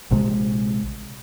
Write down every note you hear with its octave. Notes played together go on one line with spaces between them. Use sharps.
A#1 C3 G#3